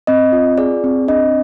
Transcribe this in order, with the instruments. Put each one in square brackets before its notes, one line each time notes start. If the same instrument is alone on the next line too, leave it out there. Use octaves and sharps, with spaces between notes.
[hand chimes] C4 D#5
F4
G#4 D5
C4
D4 D#5